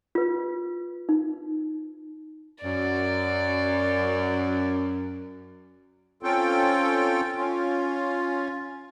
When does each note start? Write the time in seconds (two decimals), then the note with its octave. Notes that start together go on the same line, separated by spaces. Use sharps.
0.15 F4 B4
1.09 D#4
2.64 F#2 D5
6.23 C4 C#4 F4 A4 G5
7.37 C#4 F4